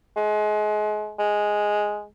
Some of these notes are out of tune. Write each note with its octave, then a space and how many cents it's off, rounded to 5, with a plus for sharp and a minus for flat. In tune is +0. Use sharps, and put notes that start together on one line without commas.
G#3 +30
G#3 +0